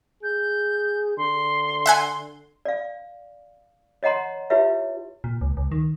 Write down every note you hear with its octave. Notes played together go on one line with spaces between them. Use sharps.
G#4 G6
D3 C6
E5 F#5 G#5
D5 F5
C#5 D#5 F#5 A#5 C6
E4 F4 G4 B4 C#5 E5
A#2
C#2
C#2
D#3